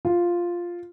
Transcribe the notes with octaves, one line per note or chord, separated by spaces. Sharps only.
F4